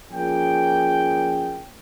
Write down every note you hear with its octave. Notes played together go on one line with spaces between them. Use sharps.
F3 A#3 C#4 G#4 G5